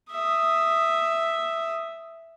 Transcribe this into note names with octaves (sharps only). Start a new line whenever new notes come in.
E5 D#6